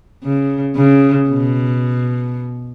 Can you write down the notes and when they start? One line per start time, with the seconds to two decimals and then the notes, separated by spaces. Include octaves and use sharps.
0.24 C#3
0.76 C#3
1.29 B2